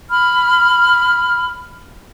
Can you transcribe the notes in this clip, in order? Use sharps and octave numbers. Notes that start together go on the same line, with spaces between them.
B5 F6